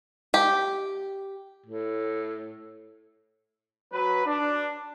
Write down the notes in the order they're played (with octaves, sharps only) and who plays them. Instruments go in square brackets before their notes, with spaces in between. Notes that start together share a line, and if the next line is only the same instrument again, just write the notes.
[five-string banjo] G4
[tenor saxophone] A2
[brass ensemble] F#3 B4
D4